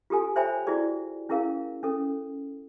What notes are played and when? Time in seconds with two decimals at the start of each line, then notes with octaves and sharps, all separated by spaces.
0.10 F4 G4 A4 G#5
0.36 C5 C#5 E5 G5 G#5 B5
0.67 E4 F#4 G#4 D5
1.29 C#4 E4 G#4 A#4 F5
1.83 C#4 A4